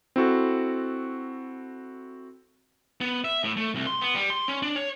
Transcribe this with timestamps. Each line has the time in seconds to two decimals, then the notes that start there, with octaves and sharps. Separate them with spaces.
0.16 C4 E4 F#4 A4
3.01 B3
3.24 E5
3.44 A2
3.57 A3
3.74 C2
3.87 C6
4.01 B3
4.15 G3
4.30 C6
4.48 C#4
4.62 D4
4.76 C#5